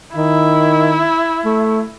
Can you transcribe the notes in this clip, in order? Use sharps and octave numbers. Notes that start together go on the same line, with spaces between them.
D#3 E4
A3